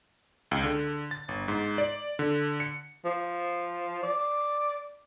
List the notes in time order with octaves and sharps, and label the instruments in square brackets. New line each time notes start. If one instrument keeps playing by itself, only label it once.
[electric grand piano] C#2
D3
A6
G1
G#2
D5
D3
C#7
[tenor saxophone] F3
D5